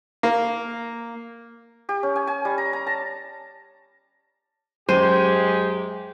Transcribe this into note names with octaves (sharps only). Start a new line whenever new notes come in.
A#3
G4
C#4
G#5
G#5
G3
A#5
A#5
A5
F#2 G#3 G4 C5 D#7